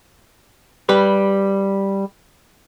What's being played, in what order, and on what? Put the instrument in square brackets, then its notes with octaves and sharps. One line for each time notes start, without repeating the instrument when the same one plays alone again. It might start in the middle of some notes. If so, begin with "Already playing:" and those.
[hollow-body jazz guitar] G3 G4 B4